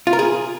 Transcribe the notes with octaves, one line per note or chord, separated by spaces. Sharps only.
F4
A#4
G#4